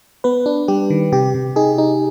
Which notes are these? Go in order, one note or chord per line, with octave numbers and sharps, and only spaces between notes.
B3 B4
D4
G3 G4
D#3
C3 G4
C3
D#4 G#4
D#4